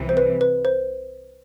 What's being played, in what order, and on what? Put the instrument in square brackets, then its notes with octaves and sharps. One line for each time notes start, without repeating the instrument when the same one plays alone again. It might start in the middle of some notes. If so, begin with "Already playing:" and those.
Already playing: [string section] C2 C3 E3
[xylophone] C5
B4
B4
C5